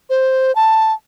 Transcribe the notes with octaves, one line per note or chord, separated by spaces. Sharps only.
C5
A5